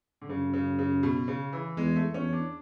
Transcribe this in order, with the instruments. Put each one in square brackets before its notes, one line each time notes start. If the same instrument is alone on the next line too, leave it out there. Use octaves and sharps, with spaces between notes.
[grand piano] D3
[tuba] F#2 [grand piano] C#3
[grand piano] C#3
C#3
B2
C#3
E3
[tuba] E2 [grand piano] G#3
[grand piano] A3
[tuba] E2 [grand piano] C#4
[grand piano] D4